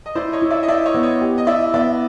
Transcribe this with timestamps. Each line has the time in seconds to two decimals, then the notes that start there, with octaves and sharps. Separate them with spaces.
0.06 D#5
0.15 E4 C5 D5
0.33 C#5 D#5
0.42 E4
0.51 D5 E5
0.63 D#5
0.68 E4 D5 E5
0.86 C#5 D#5
0.94 B3
1.03 C#5 D#5
1.21 G4
1.38 D#5
1.47 E4 D5 E5
1.74 B3 D5 E5